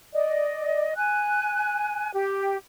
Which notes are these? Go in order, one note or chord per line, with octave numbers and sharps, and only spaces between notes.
D5 D#5
G#5 F#6
G4